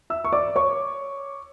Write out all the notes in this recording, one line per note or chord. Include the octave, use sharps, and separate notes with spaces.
E5 E6
C#6
D5 D6
C#5 C#6